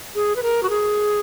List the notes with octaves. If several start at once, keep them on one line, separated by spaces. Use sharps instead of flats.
G#4
B4
A#4
F#4
G#4